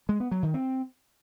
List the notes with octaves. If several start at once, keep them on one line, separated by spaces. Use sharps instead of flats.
G#3
B3
F#3
D#3
C4